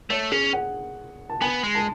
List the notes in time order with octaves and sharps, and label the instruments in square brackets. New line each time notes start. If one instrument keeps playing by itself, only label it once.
[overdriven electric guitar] A3 [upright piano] C#5
[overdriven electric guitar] C#4 [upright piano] G#4
[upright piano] F#5
A5
[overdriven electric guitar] B3 [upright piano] G#5
[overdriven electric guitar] G#3
[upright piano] A5